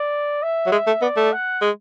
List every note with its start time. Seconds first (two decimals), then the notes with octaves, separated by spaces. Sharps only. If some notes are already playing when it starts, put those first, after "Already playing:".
Already playing: D5
0.42 E5
0.66 F#3
0.72 G#3
0.87 A3
1.02 B3 D5
1.17 A3
1.32 F#5
1.62 G#3